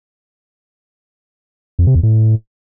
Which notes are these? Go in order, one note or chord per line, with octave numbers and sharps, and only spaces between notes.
F2
C3
E2
A2